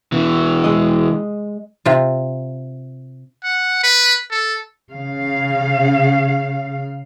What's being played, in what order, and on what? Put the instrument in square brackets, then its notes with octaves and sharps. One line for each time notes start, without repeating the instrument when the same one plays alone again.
[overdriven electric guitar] B2 E3
[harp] G#3 D#5
[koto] C3 F4
[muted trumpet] F#5
B4
A4
[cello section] C#3 F5